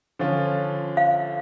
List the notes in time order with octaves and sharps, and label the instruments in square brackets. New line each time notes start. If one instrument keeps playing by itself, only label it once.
[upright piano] D3 F3 C#4 F4
[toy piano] F5